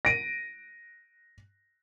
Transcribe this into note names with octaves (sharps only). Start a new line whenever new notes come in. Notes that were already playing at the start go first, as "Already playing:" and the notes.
A#6 D7 D#7